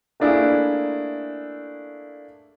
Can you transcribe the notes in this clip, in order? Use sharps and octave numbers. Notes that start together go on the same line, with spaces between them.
A3 A#3 D4 E4 G#4